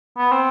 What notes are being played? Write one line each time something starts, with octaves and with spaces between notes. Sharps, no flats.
B3
C4